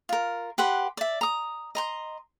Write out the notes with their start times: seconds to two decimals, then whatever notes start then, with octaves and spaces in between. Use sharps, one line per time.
0.09 F4 A#4
0.58 G4 B4 F#5 C6
0.97 D5 E5
1.21 A#5 D#6
1.75 D#5 A#5 C6